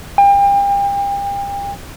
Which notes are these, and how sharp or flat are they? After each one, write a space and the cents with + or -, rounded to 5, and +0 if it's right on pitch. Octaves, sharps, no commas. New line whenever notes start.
G5 +35